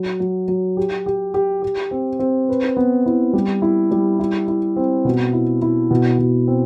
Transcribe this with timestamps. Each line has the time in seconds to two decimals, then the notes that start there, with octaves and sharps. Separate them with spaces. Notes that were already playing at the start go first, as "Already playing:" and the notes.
Already playing: F#3
0.20 F#3
0.48 F#3
0.77 G4
1.06 G4
1.34 G4
1.62 G4
1.91 C4
2.19 C4
2.49 B4
2.77 B3
3.06 E4
3.33 G3
3.62 E4
3.91 G3
4.19 E4
4.48 E4
4.76 C4
5.05 B2
5.33 E4
5.62 E4
5.91 B2
6.19 B2
6.48 C4